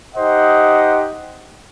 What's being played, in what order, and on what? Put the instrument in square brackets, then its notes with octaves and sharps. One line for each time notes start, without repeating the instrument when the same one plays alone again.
[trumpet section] D#4 G4 C5 D#5 F#5